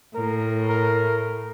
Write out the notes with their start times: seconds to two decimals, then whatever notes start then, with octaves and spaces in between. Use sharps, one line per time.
0.15 A2 A#4
0.69 A#4